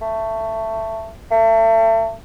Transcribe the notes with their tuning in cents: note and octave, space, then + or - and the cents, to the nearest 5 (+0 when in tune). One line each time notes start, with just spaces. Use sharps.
A3 +15
A3 +35